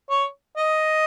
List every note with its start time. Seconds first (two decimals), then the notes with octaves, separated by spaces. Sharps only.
0.10 C#5
0.57 D#5